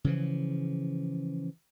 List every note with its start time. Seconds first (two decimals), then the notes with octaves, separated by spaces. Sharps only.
0.04 C#3 E3 F3